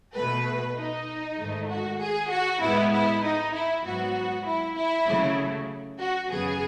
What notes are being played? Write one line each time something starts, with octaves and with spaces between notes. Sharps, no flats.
B2 A3 B4
D#4
G#2 D#3 A3
F#4
G#4
F#4
A2 G#3 B3 E4
E4
D#4
E4
G#2 F#3 B3 F#4
E4
E4
C#3 F#3 A3
F#4
F#2 C#3 F#3 B3 G#4